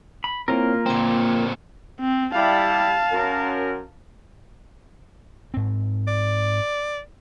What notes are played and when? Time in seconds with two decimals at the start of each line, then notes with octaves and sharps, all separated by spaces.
0.24 B5
0.48 A#3 C4 E4 F4 A#4 C#5
0.86 A#2 C4 G5 C6
2.00 C4
2.35 G3 E4 F5 A5
3.12 F#2 A#4
5.54 G#2 C4
6.07 D5